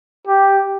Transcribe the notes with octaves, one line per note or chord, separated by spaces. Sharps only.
G4